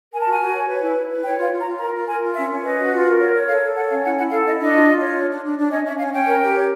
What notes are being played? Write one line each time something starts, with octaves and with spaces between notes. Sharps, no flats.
A#4 G#5
F#4 A5
G#5
F#4
C#5
B4
E4
E4
B4
C#5 G5
F4 F5
F4
A#5
F4
A#4 A#5
F4
A#4 G#5
F4
C#4 E5
C#4
B4 D#5
F#4
F4
A#4
C#5
C#5
A4 F5
A4
C#5 F#5
C#4 F5
E4 F#5
E4 F#5
A4 F5
E4 D#5
D4 D#5
F4
F4
C#5
D4
D4
D4
D4
C#4 D#5
C#4 E5
C#4 F5
C#4 G5
A#4
G4
C#5